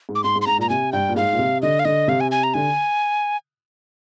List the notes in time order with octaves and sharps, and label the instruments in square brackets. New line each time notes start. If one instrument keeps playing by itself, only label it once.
[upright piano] G#2
[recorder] D6
[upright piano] G#2 [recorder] C6
[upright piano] G#2
[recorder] C6
[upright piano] G#2 [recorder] A#5
[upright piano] A#2 [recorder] A#5
[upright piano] C3 [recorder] G#5
[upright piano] G2 [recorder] G5
[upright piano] A#2
[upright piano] G#2 [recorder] F5
[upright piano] A#2
C3
[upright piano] D3 [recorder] D#5
[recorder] F5
[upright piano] D3 [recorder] D#5
[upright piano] C3 [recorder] F5
[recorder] G#5
G#5
A#5
[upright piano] D3 [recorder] G#5